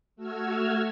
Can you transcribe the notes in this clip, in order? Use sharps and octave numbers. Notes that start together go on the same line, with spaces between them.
A3 F#4 E6 F6 G#6